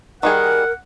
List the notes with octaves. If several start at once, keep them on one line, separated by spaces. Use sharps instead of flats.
D#3 G3 G#4 A#4 F#5